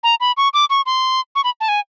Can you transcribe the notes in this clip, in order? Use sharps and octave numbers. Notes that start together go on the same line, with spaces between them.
A#5
B5
C#6
D6
C#6
C6
C#6
B5
A5
G#5